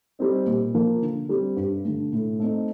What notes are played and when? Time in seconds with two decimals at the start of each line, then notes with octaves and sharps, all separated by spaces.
0.19 G3 C4 D#4
0.46 A#2
0.74 F3 A#3 F4
1.02 D3
1.29 G3 C4
1.56 G2
1.84 D3 A3
2.13 A2
2.39 A3 C4 D#4